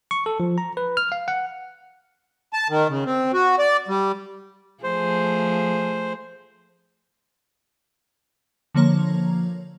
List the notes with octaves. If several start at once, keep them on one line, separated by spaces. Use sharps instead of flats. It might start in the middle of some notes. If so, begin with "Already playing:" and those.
C#6
A4
F3
A#5
B4
F6
F5
F#5
A5
D#3
C#3
C4
F#4
D5
G3
F3 A3 G#4 C5
D3 F3 A#3 C#5 A#5